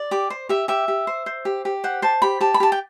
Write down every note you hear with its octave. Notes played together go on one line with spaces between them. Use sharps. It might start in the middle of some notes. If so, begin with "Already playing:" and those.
Already playing: D5
G4 D6
C5
G4 E5
G4 E5
G4
C5
C5
G4
G4
C5 F#5
C5 A5
G4 B5
G4 A5
B5
G4 A5
G5